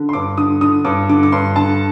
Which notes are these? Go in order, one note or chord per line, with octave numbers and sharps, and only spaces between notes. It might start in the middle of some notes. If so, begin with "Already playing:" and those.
Already playing: D3
C6
G2 D6
D3 D#6
D3 D#6
G2 D6
D3 D6
D6
G2 C6
D3 A5